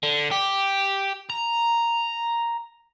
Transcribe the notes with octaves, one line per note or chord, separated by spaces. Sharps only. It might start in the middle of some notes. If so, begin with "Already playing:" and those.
D3
G4
A#5